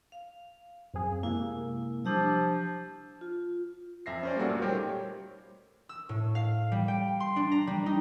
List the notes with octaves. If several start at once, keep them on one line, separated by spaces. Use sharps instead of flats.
F5
F#2 C4 G#4
C3 G#3 A#3 E4
F3 G3 D4 G4 E6
F4
F2 E5 A#6 C7
C#4 C5 D5
G3 A#3 C#4 F#4 A4
A#2 A3
G3 D#4 G4 A#4 C5 C#5
E6
A2
F5
G3
G5
C6
D4
A#5
G3
D#4